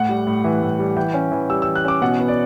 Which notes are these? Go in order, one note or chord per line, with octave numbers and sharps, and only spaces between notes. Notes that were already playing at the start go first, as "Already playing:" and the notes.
Already playing: A2 F#5
G3
A2
E3
A2
G3
E3 G5
C#4
E3
G3 E6
E3 E6
F#6
C#4 D6
B2 F#5
B3
D5